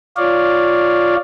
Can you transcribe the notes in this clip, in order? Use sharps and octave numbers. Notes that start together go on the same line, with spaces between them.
F4 C#5 D5 F5